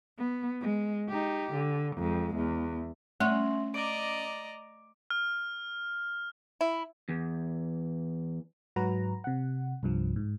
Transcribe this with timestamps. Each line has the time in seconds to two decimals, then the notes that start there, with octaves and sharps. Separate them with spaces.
0.18 B3
0.61 G#3
1.09 D#4 G4
1.53 D3
1.97 F2 G#3
2.36 E2
3.20 A3 C#4 E5 C6
3.74 D5 D#5 A#5 D6 D7
5.10 F6
6.61 E4
7.09 E2
8.76 G#2 F#3 F#4 B4 A#5
9.24 C3 F#5
9.83 C2 G2 F3
10.16 G#2